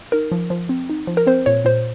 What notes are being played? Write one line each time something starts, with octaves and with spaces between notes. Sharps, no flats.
D#4 A#4
F3
F3
C4
D#4
F3
A#4
C4 C5
A#2 C#5
A#2 C5